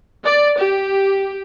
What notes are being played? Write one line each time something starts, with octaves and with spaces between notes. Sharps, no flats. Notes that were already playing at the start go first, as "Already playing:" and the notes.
D5
G4